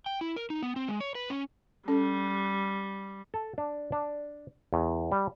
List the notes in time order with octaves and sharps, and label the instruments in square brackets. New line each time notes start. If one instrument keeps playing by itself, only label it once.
[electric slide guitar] G5
E4
A#4
D#4
B3
C4
G#3
C#5
B4
C#4
[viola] G3 [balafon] C#4 A4
[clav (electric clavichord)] A4
D4
D4
E2
G3